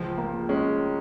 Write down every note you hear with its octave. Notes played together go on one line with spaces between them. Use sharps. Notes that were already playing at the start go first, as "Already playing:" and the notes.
Already playing: C#2 F3
A#3
G#3 C#4